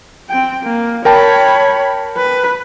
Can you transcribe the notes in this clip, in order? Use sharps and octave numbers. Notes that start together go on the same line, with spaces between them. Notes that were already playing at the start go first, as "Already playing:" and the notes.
C4 G5
A#3
A#4 C#5 G5 A5 B5
B4